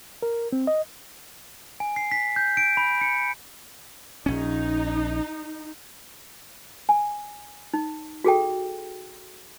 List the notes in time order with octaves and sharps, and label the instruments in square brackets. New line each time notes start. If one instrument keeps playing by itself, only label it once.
[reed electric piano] A#4
C4
D#5
[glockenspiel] G#5
C7
B6
G6
D7
B5
C#7
[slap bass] A#1 C#4 [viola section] D#4
[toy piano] G#5
D#4
F#4 G#4 A4 G5